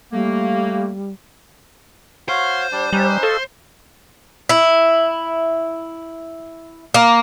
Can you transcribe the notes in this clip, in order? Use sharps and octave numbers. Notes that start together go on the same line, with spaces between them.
G3 A3 A#3
F#4 C5 C#5 F5
G3 D4 D5
G3 C#4 D#4 B4
A4 D#5 F5 C#6
E4
A#3